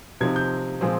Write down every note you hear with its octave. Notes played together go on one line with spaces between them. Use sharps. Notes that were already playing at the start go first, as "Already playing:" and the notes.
C3 F3 C4 D#4 G#6
G6
A#2 F3 G#3 C4